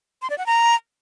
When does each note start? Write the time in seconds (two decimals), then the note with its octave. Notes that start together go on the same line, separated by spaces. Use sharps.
0.22 C6
0.30 D5
0.38 F#5
0.46 A#5